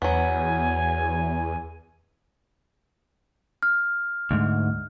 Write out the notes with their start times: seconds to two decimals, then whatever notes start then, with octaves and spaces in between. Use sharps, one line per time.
0.02 E2 F#3 B3 G#5
3.63 F6
4.31 D2 G#2